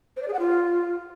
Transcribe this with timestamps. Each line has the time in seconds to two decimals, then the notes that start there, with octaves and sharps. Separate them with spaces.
0.16 C5
0.22 D5
0.28 G#4
0.33 F#5
0.39 F4